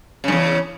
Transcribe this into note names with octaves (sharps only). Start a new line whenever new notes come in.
E2 G2 C#3